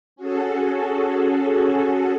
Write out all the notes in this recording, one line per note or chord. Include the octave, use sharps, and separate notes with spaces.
C#4 F#4 G#4 A4